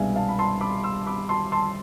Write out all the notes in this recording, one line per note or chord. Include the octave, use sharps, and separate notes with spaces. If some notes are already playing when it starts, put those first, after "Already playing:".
Already playing: C2 B2 G#3 B3 D4 E5 F5 G#5
F5 A5
B5
A5 C6
B5 D6
C6 E6
B5 D6
A5 C6
A5 C6